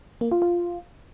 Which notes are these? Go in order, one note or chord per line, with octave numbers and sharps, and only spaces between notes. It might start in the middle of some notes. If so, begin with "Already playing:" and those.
A#3
F4
F4